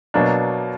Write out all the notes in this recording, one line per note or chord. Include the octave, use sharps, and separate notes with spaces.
B2 F#3 A#3 D4